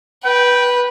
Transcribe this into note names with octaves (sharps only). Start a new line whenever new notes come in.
B4 G5